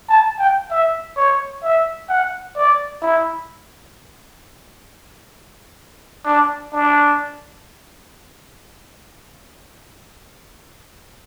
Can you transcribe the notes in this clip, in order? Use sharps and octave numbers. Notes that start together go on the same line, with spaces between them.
A5
G5
E5
C#5
E5
F#5
D5
E4
D4
D4